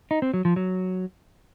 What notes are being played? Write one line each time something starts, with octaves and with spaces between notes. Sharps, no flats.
D#4
C4
F#3
F3
F#3